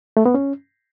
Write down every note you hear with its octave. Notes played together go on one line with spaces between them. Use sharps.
A3
B3
C#4